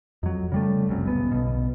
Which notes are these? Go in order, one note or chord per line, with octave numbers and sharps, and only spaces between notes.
F2 F#3
C#3 G3 A3
F1 C2 F#2
D1 C#2 B3
B1 B2